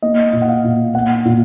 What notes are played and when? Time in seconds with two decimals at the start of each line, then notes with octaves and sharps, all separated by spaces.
0.02 A#3 D#5
0.33 A#2
0.42 F#5
0.48 F5
0.64 A#2
0.94 A#3 F#5
1.25 A#2